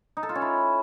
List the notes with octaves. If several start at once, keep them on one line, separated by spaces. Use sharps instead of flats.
D#4
A4
F4
C#4
E4